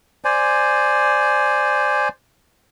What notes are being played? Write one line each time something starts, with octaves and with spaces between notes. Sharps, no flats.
C5 D5 G#5